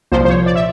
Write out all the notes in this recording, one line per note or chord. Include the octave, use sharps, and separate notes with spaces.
C2 A#2 F3 C5
C5
C#5
D5
E5